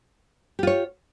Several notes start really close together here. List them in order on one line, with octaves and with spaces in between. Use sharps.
G4 F4 C#5